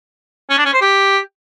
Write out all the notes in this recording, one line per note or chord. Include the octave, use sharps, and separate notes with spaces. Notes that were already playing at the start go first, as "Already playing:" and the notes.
C#4
D4
C#4
C5
G4